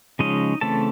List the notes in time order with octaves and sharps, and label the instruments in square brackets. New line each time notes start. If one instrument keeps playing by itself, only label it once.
[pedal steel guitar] C#3 F3 G#3 C#4 D#4 D#5
C#3 E3 A3 C4 A4 A5